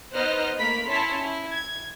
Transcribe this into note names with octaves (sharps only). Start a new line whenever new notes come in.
B3 D#4 C5 D#5 F6 F#6
A3 A#3 A#4 B5 B6
C#4 E4 C#5 A5 C6 B6
E4
G#6